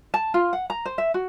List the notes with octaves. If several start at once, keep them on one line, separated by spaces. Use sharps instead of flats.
A5
F4
F#5
A#5
C5
E5
F#4